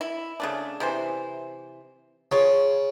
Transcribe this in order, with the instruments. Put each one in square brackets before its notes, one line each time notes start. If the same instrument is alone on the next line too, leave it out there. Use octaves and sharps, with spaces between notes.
[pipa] E4
C#3 A3 D4
C3 E3 C5
[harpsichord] C#3 [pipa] F4 C#5